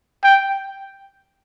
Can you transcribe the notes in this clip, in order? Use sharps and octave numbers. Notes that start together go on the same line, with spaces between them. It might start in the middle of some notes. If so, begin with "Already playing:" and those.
G5